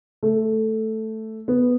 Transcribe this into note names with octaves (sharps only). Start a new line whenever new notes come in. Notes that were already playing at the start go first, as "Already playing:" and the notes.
A3
B3